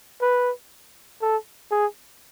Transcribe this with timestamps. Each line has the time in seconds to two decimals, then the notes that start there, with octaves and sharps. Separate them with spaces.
0.21 B4
1.22 A4
1.71 G#4